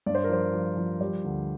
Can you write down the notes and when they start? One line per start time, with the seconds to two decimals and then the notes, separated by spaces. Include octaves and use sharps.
0.06 G2 D5
0.15 C5
0.24 A#4
0.29 F3 C5
0.54 F3
0.77 F3
1.01 G3
1.24 D2